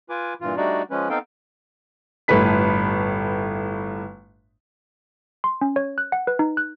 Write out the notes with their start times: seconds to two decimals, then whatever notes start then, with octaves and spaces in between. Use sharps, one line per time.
0.10 F4 B4 G#5 D6
0.41 G2 A#2 E3 F4
0.57 G3 A3 D4 D#4 F#4 D5
0.91 F3 G#3 C#4 B4
1.10 B3 C4 D#4 A4 F5 G5
2.28 G1 A2 A4 B4 B6
5.44 C6
5.62 C#4
5.76 C#5
5.98 F#6
6.12 F#5
6.27 B4
6.39 D#4
6.57 F#6